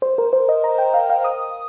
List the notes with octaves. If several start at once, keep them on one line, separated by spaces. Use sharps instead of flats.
C5
A#4
C5
D#5
A#5
G5
F5
F5
D#6